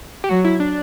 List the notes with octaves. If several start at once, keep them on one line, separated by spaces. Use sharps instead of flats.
G4
F#3 F#4
E4
D4